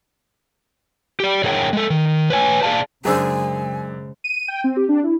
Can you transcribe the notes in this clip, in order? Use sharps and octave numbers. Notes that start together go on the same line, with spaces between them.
G4 D5
D3 G#4 A#4 C#5 G5
G#3 A4
D#3
B4 C#5 G#5
G#4 D5 F5 A5
F#2 C#3 G#3 D4 G#4 C5 G#5 E6
D#7
G5
C4
G4
D4
E4